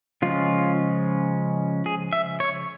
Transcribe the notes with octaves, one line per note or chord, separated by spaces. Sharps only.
C#3 F3 G#3 C#4 F4
G#4
E5
C#5